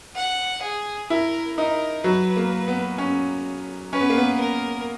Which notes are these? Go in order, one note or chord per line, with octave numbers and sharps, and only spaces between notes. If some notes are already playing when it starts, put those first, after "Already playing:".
F#5
G#4
E4 A#4
D#4 A#4
F#3 B4
A#3
B3
C#4
C#4 B4
B3
A#3
B3
A#4